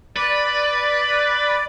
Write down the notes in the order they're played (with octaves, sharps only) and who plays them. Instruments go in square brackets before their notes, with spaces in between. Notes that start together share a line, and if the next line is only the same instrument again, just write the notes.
[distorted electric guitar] B4 [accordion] D5